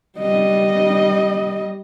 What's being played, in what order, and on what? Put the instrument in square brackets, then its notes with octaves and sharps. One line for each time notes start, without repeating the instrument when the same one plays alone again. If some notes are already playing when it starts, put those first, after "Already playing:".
[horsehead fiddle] G3 D#5